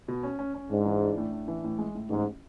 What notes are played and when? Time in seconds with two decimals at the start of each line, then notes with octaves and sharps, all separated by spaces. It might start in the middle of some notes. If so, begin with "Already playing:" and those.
0.08 B2
0.23 C#4
0.39 C#4
0.55 C#4
0.70 G#2 D4
0.86 E3
1.01 D4
1.17 A2
1.32 D4
1.48 E3
1.64 A2
1.78 G#3
1.95 A2
2.10 A1 G#2